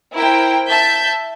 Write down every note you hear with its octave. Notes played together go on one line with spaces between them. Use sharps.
E4 A#4 C5 G5
E5 A5 G6